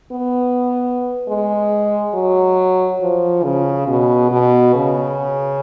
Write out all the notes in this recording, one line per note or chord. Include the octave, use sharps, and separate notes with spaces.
B3
G#3
F#3
F3
C#3
B2
B2
C#3